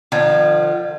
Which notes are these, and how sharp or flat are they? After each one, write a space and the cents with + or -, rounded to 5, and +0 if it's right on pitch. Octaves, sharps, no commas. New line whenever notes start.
D3 +45 F3 +0